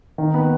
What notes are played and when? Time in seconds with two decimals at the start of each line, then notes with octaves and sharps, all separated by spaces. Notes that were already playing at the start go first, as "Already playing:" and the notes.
0.18 D#3
0.34 B3